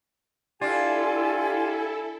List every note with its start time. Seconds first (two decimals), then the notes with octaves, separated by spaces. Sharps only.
0.61 D4 E4 F4 G4 A4 F5 G#5